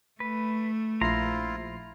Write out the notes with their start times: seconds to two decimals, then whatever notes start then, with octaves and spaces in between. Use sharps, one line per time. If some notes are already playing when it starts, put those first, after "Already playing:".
0.20 A3 B4
1.01 A#1 E4 F4 C5 A#5 C7